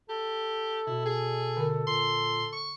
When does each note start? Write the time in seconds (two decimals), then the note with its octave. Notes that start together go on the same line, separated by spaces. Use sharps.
0.09 G4 A4
0.87 B2 E4
1.06 G#4
1.57 D3 A#4
1.87 A#2 C6
2.53 C#6